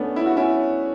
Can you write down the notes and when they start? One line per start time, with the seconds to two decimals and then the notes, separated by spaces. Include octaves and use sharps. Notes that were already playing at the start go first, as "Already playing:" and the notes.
Already playing: A3 B3 C#4 D4
0.16 E4
0.26 F#4
0.36 C#4 E4